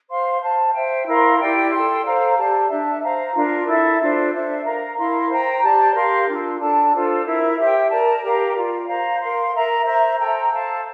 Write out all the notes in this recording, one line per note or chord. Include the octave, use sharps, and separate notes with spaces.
C5 F5 C6
C5 F5 A5
C5 E5 G5
E4 A#4 F5 C6
E4 G4 D5 G5
A4 D5 G5 C6
A4 C5 F5 A#5
G4 D5 A5
D4 A4 E5 A5
C5 F5 A#5
D4 F4 A#4
E4 A4 E5
D4 F4 A4 C5
D4 A4 C5 E5
A#4 F5 A#5
E4 A#4 F5 C6
C5 G5 A#5
G4 D5 A5
G4 A#4 F5 C6
D4 F4 A4
D4 A4 D5 A5
D4 F4 A4 C5
E4 A#4 E5
G4 C5 E5 G5
A#4 D5 A5
G4 A#4 F5 A#5
F4 A#4 D5
C5 F5 A#5
A#4 F5 C6
A#4 E5 A#5
C5 E5 A#5
A4 C5 G5 A#5
A4 C5 F5 A5